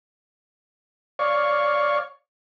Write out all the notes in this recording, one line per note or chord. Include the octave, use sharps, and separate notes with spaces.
C#5 D5 F5 C#6